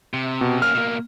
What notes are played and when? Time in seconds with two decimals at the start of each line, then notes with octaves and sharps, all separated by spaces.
0.13 C3
0.41 B2
0.62 A#3 C#4 F6
0.74 B2 A#3